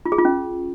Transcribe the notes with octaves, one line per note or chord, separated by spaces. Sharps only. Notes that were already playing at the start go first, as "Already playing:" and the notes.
F4
G#4
F4
C#4